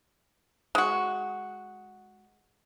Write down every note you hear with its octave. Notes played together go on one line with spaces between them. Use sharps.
G#3 F#4